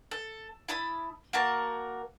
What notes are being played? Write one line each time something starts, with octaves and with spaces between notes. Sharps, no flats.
A4
E4 A5 B5 D#6
A#3 F#4 A#4 A5